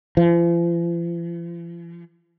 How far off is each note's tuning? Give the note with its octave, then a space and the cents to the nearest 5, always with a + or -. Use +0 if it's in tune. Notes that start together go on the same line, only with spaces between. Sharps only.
F3 -45